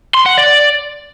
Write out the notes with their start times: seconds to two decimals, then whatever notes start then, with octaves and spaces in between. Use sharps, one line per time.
0.14 C6
0.26 F#5
0.38 D5